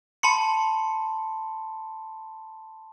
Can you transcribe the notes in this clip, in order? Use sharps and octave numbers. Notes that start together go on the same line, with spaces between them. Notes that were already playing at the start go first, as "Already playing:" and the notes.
A5 B5 C6 C#7